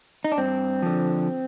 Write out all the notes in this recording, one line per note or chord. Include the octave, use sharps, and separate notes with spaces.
D#4
D4
G2 C4
D3 F3